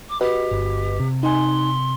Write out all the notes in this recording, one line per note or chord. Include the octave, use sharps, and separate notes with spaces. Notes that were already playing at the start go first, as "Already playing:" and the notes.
D6
F#4 G4 B4 D#5
G1
C3
D#4 G#5 C6